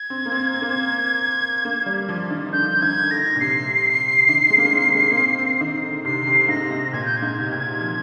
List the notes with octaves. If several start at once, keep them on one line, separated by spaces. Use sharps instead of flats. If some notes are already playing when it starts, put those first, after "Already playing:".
Already playing: G#6
C4
A#3
C4
C4
A#3
C4
A#3
G3
F3
D#3
D#3
D3 G6
D#3 G#6
D3 A#6
A#2
C3 C7
D#3
G#3
A#3
G#3
C4
G#3
A#3
C4
C4
D#3
D3
C3 C7
C3
G#2 A#6
G#2
A#2 G#6
G6
G#6
G#2
C3
A#2
F3